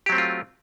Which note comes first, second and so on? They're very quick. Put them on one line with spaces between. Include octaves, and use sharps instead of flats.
G4 F#3 C4 A3 F4